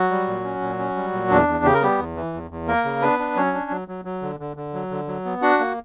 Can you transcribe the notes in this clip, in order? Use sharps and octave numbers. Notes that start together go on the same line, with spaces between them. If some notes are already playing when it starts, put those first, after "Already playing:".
Already playing: F#3 F#4
G3
A#2
C#4
A#2
C#4
G3
A#2
E2 D4
E2
C#3 G4
A#4
G3 B3 G4
E2
E3
E2
E2
A#3 A#4
C#3
B3 D4 B4
D4
F#3 C#4 C#5
D4
F#3
F#3
F#3
D3
D3
D3
F#3
D3
F#3
B3
D4 F#4 F#5
A#3